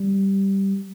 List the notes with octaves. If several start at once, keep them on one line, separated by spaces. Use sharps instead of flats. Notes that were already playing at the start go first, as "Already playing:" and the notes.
Already playing: G3